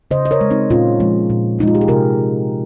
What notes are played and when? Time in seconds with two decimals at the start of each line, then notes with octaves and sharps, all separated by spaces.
0.11 C#3 C5 D#5
0.26 D#5
0.31 A#4 C#5
0.41 G#3
0.50 C4 D#4
0.70 A#2 C#4 F4
1.00 F3 G#3
1.30 A#2
1.59 F3 D#4
1.63 G#3 F4
1.75 G4
1.81 G#4
1.88 C3 G4 A#4